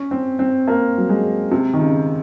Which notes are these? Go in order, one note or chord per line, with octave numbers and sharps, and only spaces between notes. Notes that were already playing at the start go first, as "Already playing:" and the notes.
Already playing: C#4
C4
C4
A#3
F#3
G#3
C3
D#3
C#3